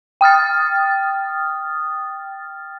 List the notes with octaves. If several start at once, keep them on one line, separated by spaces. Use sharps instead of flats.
G5 D#6 F6 A6